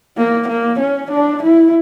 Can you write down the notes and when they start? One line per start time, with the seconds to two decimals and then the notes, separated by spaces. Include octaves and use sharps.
0.17 A#3
0.48 A#3
0.80 C#4
1.11 D4
1.43 E4